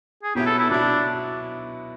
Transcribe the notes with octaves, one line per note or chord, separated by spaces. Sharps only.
G#4
B2 F#3 B3 E4 G4
A4
E4
B2 F#3 B3 D4 E4